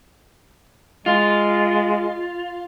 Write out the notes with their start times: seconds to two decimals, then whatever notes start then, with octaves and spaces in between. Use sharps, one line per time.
1.06 G#3 F4